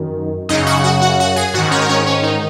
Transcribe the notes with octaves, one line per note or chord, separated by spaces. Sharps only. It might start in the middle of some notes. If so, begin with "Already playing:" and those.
Already playing: F#2 D#3
F#2 C#3 D#4 D#5
F#4 F#5
F#4 F#5
F#4 F#5
F#4 F#5
G#4 G#5
G#2 D#3 F#4 F#5
C#4 C#5
A#4
C#4 C#5
C#4 C#5
D#4